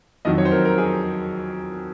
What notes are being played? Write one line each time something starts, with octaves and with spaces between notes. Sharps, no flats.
F2 D#3 F#3 D#5
C#5
C5
A#4
A#4
G#4